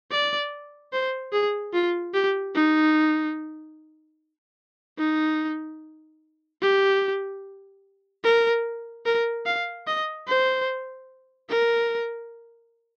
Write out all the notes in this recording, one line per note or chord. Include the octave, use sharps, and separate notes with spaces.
D5
C5
G#4
F4
G4
D#4
D#4
G4
A#4
A#4
F5
D#5
C5
A#4